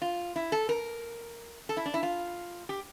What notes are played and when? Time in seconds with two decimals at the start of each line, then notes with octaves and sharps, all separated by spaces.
0.02 F4
0.36 E4
0.52 A4
0.69 A#4
1.69 A4
1.77 E4
1.86 D4
1.94 E4
2.03 F4
2.69 G4